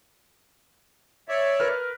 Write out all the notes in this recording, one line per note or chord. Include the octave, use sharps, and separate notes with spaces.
C#5 D5 E5
A#4 B4 F6